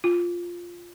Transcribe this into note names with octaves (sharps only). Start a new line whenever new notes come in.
F4